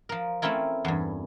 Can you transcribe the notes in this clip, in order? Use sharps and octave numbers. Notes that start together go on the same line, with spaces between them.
F3 A#4
A3 C4 C#4 E4 A#4
E2 G2